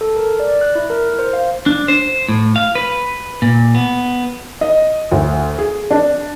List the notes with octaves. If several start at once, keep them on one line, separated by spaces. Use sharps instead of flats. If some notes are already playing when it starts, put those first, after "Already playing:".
A4
A#4
D5
F#6
E4
A#4
C5
F5
D4
C5
A2
F5
B4
A#2
B3
D#5
D2
G#4
D4